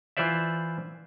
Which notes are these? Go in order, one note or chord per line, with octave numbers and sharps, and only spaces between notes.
E3 F4 C5 D5 E5